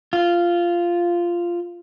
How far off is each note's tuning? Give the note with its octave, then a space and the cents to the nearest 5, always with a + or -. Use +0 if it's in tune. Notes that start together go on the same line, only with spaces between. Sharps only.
F4 -10